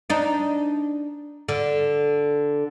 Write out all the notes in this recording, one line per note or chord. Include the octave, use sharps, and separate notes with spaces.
D4 D#4
D3